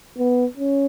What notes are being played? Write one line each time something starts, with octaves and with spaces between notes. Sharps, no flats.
B3
C#4